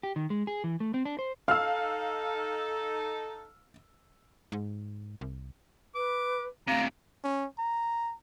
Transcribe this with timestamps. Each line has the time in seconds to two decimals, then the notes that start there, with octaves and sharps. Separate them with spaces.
0.03 G4
0.16 D#3
0.30 G#3
0.47 G#4
0.64 E3
0.80 A3
0.94 C4
1.05 D4
1.19 C5
1.48 D#4 A4 F5 E6 F6
4.52 G#2
5.21 C2
5.95 B4 D6
6.68 D2 C3 F5 A#5
7.24 C#4
7.58 A#5